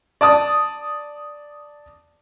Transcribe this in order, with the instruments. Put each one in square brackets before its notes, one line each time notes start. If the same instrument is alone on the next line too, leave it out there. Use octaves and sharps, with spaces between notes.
[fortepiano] D5 A5 D#6